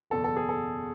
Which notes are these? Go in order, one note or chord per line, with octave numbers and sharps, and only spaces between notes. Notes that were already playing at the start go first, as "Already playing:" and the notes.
F#1 E2 B2 A4
A4
G#4
A4